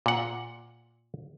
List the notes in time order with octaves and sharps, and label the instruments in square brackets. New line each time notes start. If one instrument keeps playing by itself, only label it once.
[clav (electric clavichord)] A#2 F#5